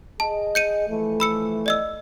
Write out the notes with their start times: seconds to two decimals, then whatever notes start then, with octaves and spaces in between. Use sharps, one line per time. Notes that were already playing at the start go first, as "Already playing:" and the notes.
0.20 G#4 D#5 A5
0.55 G6 C#7 D#7
0.88 E3 F3 A3
1.20 B5 E6 C#7
1.66 D5 D#5 E6